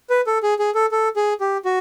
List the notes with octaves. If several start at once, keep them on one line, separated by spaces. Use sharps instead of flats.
B4
A4
G#4
G#4
A4
A4
G#4
G4
F#4